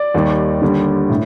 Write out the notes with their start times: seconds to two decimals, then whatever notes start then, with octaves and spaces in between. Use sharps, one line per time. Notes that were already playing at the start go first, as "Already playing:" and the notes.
Already playing: D5
0.14 D#2 D#3 G3
0.62 D#2 D3 G3
1.10 A2